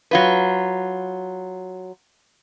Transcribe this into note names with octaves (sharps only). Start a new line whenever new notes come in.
F#3 F4 B4